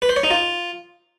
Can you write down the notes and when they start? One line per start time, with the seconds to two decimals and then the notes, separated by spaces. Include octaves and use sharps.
0.02 B4
0.09 C5
0.16 C#5
0.23 D#4
0.31 F4